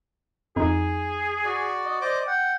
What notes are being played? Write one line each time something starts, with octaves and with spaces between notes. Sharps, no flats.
F2 D#4 G#4
F#4 D5
D#5
C5 D5 D#5 D6
F#5 G5